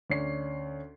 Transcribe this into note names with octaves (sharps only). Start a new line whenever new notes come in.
D2 C#4 D5 C7